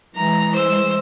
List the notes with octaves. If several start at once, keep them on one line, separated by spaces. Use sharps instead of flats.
E3 G#3 A#5
C5 E6